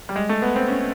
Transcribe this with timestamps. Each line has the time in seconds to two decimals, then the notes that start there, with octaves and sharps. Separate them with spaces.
0.09 G3
0.16 G#3
0.29 A3
0.42 B3
0.56 C4
0.68 C#4